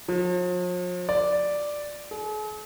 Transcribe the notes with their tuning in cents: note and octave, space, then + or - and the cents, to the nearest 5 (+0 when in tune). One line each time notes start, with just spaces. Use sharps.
F3 +45
D5 +0
G#4 +45